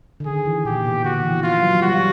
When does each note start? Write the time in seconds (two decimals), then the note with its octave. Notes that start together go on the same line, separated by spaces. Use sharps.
0.20 D3
0.26 D#3 G#4
0.46 E3
0.65 A#2 G4
0.85 B2
1.04 D3 F#4
1.24 E3
1.43 F3 F4
1.63 F#3
1.82 G3 F#4